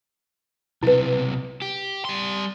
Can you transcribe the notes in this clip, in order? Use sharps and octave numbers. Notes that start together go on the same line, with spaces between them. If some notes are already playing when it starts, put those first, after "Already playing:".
B1 C3 E4 B4
G4
G3 C6